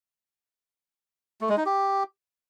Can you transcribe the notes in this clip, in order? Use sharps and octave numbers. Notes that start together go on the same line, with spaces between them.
A3
G#3
D#4
G4